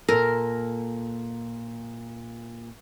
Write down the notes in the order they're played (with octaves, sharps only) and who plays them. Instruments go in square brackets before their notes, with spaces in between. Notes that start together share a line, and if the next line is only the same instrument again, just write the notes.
[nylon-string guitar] A#2 A4 [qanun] A#4